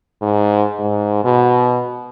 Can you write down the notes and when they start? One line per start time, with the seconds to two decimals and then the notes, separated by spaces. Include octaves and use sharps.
0.22 G#2
0.80 G#2
1.24 B2